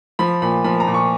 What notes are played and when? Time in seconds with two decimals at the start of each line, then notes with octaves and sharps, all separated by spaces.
0.19 F3 B5
0.42 A#2 B5
0.64 F3 B5
0.80 A#5
0.87 A#2
0.94 C#6